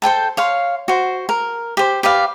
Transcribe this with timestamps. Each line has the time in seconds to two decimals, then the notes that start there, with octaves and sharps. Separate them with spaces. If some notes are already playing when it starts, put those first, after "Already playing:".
0.02 A4 C5 G5 A5
0.37 C#5 F5 C6
0.88 F#4 C5
1.29 A#4
1.77 G4 C5
2.03 G4 B4 D5 F5